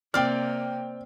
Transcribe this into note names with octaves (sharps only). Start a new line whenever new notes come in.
C3 A#3 C4 D5 G5 F6